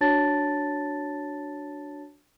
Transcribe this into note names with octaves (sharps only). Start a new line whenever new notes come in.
D4 F#4 C#5 A5 A6